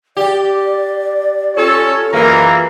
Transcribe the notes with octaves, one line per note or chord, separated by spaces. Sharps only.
G4 D5
C#4 F4 A4 C#5
F#2 E3 G#3 A#3 A#4 F5 A#5